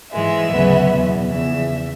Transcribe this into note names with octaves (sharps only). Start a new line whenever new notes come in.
G#2 E3 G#3 E5
D2 C#3 F#3 B3
E2 B2 F#3
E2 C#3 F3 E5